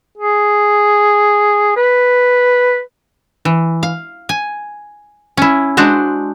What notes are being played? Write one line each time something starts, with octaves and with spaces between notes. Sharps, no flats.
G#4
B4
E3
F5
G#5
C#4 E4
G#3 D4 F#4 C5